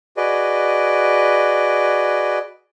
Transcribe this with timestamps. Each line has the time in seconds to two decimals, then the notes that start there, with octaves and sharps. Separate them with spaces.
0.17 F#4 G#4 B4 D5 D#5